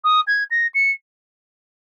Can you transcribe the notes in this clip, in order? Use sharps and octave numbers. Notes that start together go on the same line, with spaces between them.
D#6
G#6
A#6
C#7